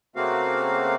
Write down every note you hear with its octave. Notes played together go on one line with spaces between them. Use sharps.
C#3 A3 A#3 C4 F#4 F5